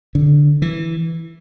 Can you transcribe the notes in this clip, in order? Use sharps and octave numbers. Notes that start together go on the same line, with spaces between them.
D3
E3